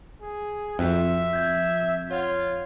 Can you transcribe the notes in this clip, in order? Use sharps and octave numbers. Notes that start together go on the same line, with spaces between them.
G#4
F2 F#4 E5 G5 F#6
G6 G#6
F4 C#5 F#5 G#6